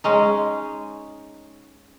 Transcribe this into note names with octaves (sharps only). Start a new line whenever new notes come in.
G#3 C#4 D#4